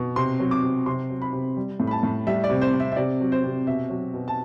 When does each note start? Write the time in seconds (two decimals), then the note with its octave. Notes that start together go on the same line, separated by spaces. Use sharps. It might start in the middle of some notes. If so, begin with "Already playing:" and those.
Already playing: B2
0.16 C3 C6
0.40 F#3
0.51 D6
0.63 C3
0.86 C3 C6
1.10 F#3
1.22 B5
1.33 C3
1.57 G3
1.80 A2
1.87 B5
1.91 A5
2.03 A2
2.27 G3 E5
2.44 D5
2.50 C3
2.61 C5
2.73 C3
2.80 E5
2.92 E5
2.96 C3 D5
3.20 F#3
3.32 C5
3.44 C3
3.67 B2 E5
3.90 F#3
4.14 B2
4.28 A5